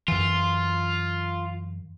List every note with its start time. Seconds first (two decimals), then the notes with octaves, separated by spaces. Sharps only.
0.08 F#2 E3 F4